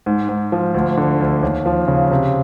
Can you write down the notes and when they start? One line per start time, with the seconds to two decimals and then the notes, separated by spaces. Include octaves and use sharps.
0.06 G#2
0.29 G#2
0.52 F3
0.74 D2
0.97 D3
1.20 D2
1.43 D#2
1.66 F3
1.88 C#3
2.11 C3